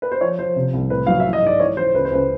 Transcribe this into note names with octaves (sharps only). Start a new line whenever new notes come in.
B4
C5
F3 C#5
F3 C5
C3
C2
A2 B4
F#3 F5
E5
E3
D#5
G#2 D5
E3 C#5
E3 C5
C#2 B4
C5
C#2 B4